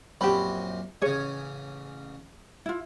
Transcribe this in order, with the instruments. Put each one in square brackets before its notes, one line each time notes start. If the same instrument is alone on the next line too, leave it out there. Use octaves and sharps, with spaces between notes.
[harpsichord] A#1 F#2 C4 [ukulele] G4 B5
[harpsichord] A1 C#3 [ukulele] G#4 C#5
[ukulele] E4 F4